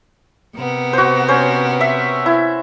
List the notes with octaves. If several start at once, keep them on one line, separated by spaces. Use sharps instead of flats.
C3 B3 A#4
F#4 C5
C#4 C5
E5
E4